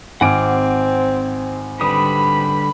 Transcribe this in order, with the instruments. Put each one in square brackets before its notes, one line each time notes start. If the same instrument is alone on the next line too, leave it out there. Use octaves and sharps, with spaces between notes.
[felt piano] G#1 G#5 D7 [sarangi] C4 [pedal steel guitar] F#5 D6 F6
[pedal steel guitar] D3 G3 D#6 [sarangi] B4 [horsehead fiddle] B5